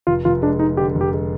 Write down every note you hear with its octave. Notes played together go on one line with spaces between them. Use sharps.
F1 F4
F1 F4
G#3 D4
G#3 D#4
D3 G4
F1
G4
G#3